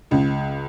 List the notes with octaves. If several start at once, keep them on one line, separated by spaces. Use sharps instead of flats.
C#2 C#3